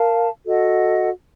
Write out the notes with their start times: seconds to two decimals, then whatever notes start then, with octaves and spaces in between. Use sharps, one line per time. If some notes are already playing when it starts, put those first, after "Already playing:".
Already playing: A#4 F5 A5
0.45 F#4 A4 D#5 F#5